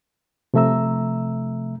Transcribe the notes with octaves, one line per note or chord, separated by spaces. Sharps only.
C3 F3 A3 E5 A#5 E6